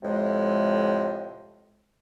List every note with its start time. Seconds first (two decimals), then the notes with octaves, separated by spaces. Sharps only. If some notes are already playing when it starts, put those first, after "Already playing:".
0.02 F2 A2 C3 G#3